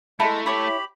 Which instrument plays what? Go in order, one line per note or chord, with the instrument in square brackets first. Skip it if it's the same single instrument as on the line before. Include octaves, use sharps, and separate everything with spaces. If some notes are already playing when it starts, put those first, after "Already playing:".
[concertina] G#3 A#5 [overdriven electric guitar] A3 [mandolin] E4 [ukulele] A4 E5 A5
[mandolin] E4 C#5 [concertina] G4 B5